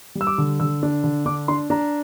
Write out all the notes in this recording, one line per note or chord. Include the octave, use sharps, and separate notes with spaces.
G3
E6
D6
D3
D3 E6
D4
D3
D4 D6
D4 C6
D4 A#5